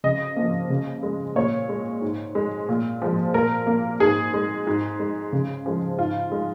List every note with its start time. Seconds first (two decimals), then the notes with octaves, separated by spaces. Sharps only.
0.04 C#3 D#5
0.36 F3 A#3
0.70 C#3
1.03 G#3
1.36 A#2 C#5
1.69 G#3
2.01 G#2
2.35 G#3
2.69 A#2
3.02 F3 G#3
3.34 A#2 A#4
3.67 A#3
4.00 G#2 G#4
4.34 G#3
4.67 G#2
4.99 G#3
5.33 C#3
5.66 F3 G#3
5.98 G#2 F4
6.32 G#3